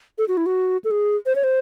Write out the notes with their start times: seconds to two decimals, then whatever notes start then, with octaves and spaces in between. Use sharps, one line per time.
0.18 A4
0.28 F#4
0.37 E4
0.46 F#4
0.84 A4
0.91 G#4
1.26 C5
1.36 C#5
1.44 C5